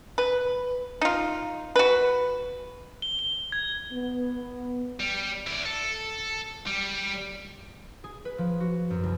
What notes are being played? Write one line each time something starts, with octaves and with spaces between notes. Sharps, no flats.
B4
D#4 F4
F#4 B4
G7
G7
G#6
B3
G3
E4 D5
A4
G3
G#4
B4
F3
F#4
F#2
C2